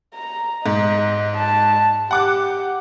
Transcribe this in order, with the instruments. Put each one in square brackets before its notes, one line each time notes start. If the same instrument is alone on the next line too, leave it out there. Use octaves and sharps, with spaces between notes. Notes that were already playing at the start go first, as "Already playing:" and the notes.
[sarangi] A#5
[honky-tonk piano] G#2 [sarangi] D#5
[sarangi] A5
[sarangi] G4 [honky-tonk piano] F#5 D6 F#6